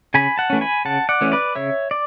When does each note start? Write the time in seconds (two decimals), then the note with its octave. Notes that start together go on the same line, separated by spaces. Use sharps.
0.14 C#3 G#5 B5
0.38 F#5 A5
0.50 E3 A3 C#4
0.61 G#5 B5
0.85 C#3 F#5 A5
1.09 D5 F#5
1.21 E3 A3 C#4
1.32 B4 D5
1.55 C#3 C#5 E5
1.91 D5